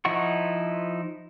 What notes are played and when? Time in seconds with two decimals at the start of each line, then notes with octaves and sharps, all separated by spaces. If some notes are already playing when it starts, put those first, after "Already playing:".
0.05 F3 D#4 E4 F#5 C#6